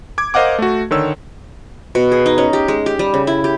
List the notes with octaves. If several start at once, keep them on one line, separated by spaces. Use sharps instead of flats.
D6 G#6
A#4 C5 D#5 F5 F#5 D6
A3 F#4
D3 D#3 C#5 E6
B2
G#4
D#4
C#4
G4
G#3
G4
G3
C#3
E4
G4